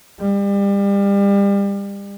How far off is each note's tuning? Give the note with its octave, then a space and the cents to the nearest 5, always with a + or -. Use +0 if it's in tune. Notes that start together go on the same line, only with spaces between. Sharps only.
G3 +30